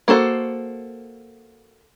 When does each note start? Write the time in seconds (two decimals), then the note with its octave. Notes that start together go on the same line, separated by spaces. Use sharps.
0.08 A#3 F#4 A4 C5